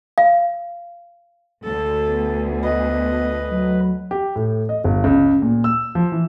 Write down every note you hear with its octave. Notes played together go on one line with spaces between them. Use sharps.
F5
D2 A4
B3
B4 D#5
F#3
G4
A2
D#5
G1
C#2
A#2
E6
F3
E3